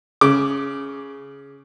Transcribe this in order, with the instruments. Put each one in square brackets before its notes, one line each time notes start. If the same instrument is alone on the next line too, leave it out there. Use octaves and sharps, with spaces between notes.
[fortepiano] C#3 D6